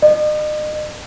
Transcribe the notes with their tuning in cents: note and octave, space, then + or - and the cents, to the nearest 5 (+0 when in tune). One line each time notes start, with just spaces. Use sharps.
D#5 -40